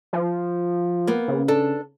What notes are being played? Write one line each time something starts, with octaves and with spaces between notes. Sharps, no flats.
F3
A#3 B3
C#3
D4 A4